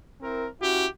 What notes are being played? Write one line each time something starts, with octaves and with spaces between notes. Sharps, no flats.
C4 E4 A#4
C#4 E4 F#4 G4